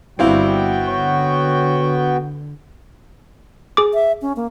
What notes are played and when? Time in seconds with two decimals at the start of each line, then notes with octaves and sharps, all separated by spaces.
0.19 G1 G3 B3 C4 E4 F#4 F5 G5
0.87 D3 C#5
3.77 G#4 D6
3.94 E5
4.22 C#4
4.36 A#3